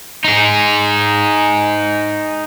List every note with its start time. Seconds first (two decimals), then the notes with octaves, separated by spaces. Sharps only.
0.25 D#4 G#4